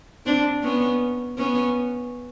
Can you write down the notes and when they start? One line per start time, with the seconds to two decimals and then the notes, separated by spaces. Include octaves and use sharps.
0.26 C4 D4
0.63 B3 C#4
1.38 B3 C#4